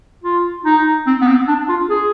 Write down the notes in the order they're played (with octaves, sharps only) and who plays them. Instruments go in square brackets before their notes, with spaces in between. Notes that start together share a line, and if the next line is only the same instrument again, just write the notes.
[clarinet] F4
D#4
C4
B3
C4
D4
F4
G#4